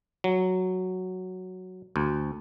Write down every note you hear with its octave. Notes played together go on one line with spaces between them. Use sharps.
F#3
D2